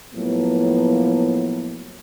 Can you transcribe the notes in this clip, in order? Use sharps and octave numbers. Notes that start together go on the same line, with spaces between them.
A2 F3 F#3 A#3 B3